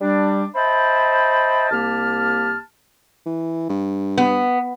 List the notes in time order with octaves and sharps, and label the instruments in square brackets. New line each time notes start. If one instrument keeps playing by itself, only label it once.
[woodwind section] G3 D4
C5 D#5 E5 G5 A5 B5
C2 A#3 G4 A5 F6
[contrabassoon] E3
G2
[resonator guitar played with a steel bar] B3